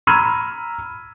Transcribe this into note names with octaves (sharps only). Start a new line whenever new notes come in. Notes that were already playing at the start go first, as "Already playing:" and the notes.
A#5 B5 E6 F6 G#6 D#7